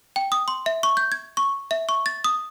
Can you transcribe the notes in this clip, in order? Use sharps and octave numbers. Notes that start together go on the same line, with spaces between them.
G5
D#6
C6
E5
C#6
G6
G#6
C#6
E5
C#6
A6
D#6